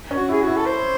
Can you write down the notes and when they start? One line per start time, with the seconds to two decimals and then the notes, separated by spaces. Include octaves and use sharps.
0.11 C#4
0.17 F#4
0.29 E4
0.32 G#4
0.42 F#4
0.47 E4
0.57 A4
0.66 C5